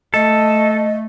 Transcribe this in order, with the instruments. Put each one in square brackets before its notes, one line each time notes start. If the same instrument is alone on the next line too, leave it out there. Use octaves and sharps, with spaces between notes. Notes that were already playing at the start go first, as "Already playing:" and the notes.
[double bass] A3 [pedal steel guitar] A4 [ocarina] D#5